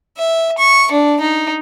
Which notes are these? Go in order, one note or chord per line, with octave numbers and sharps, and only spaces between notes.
E5
C#6
D4
D#4